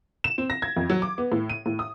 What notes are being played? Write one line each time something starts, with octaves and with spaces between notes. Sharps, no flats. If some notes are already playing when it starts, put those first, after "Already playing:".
E7
C4
A#6
G#6
F2
F#3
D6
B3
A2
D#7
A2
D#6